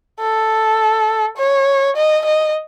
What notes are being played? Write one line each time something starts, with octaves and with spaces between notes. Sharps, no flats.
A4
C#5
D#5
D#5